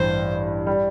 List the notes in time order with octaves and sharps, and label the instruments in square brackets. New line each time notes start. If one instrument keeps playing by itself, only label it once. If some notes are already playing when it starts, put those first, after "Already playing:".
Already playing: [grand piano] A1 G2 E3 [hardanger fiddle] C5
[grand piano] G3